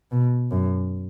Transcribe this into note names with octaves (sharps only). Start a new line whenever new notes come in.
B2
F#2